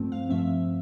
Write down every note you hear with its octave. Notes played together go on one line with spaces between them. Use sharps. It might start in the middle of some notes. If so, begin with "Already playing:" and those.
Already playing: G2 F3 A3 C4
F5
G2 F3 A3 C4 E5